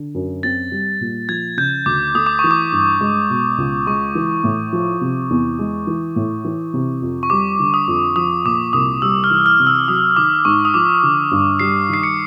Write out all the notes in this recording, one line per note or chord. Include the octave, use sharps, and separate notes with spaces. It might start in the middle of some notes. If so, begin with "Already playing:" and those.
Already playing: D3
F#2
C4 A6
G3
A#2
F3 G#6
C#3 G6
D2 D6
A3 D#6
D6
E3 C#6
D6
G2
G#3
B2
C#2
G#3 C#6
E3
A2
F3
C3
E2
G#3
E3
A2
E3
C3
F2
C#6
G3 D6
D3
D#6
F2
F3 D#6
A#2 D6
C2 D#6
G3 E6
F6
E3
F6
C3
E6
F#3 D#6
D#3 D6
G#2 C#6
D#6
F3 D6
D3
G2
G3 C7
D#3 C7
C#7